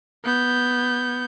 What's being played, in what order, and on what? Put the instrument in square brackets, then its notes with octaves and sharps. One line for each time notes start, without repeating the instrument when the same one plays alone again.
[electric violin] B3 G6